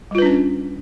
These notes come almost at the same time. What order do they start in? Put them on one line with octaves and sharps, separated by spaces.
G3 F4 B4 D4 C#4